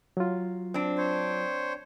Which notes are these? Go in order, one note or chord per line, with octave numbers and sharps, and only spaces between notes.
F#3 F4
C4 D4
C5 C#5